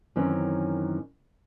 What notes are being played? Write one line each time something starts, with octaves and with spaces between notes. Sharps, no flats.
F#2 D#3 E3 C4 C#4